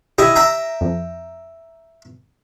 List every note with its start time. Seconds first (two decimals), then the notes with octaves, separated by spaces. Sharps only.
0.18 E4 G4 D#5 G#5
0.36 E5 G5 A#5
0.81 F2